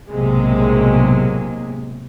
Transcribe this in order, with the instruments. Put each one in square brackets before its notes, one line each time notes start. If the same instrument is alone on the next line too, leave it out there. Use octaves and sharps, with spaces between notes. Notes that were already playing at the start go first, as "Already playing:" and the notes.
[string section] B1 A2 C3 F#3 G#3 A#3